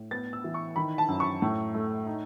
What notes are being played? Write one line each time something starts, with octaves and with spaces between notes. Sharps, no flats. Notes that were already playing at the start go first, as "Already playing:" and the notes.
Already playing: A2
B3 A6
E6
E3
C#6
D#3 B5
A5
F#2
C#6
A2
A3
D#4